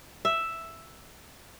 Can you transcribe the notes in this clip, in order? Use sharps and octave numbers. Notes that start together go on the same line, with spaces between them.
E5